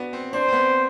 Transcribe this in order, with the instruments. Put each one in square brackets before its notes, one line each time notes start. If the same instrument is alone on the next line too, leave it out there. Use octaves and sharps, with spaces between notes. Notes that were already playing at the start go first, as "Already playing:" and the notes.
Already playing: [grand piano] B3 D4 F#4
C4
[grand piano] D4 [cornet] C5
[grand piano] C4
B3